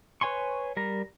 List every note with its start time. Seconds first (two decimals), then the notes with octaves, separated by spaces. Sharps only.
0.21 B4 C#5 G#5 C6 C#6
0.77 G3 A#4 A#5